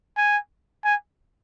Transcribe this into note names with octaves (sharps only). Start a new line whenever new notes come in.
G#5
G#5